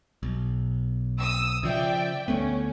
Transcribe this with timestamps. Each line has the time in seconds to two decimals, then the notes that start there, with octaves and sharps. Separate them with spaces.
0.23 B1
1.19 D#6 E6
1.63 C#3 F3 D5 E5 G5
2.28 D2 A3 B3 C#4